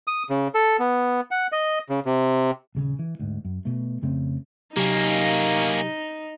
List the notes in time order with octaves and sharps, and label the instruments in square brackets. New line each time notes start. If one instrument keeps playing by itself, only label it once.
[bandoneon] D#6
C#3
A4
B3
F#5
D#5
C#3
C3
[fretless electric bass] D#1 C#3 C#4
E3
D2 G#2
F#2
B2 A3
F2 C#3 A3 C4
[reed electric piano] C3 F#3 G4 [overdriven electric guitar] A#3 C#4 [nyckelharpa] D#4